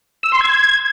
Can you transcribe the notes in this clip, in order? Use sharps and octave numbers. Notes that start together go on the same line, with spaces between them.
E6
C6
G#6